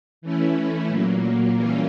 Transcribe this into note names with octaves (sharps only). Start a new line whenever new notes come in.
E3 A3 C#4 E4
A#2 F#3 A#3
E3 G3 A#3 C#4 F4